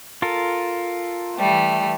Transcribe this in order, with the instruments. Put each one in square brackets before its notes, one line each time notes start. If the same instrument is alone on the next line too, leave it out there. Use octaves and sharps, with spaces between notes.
[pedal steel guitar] F4 A4 A#4
[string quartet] E3 G3 A3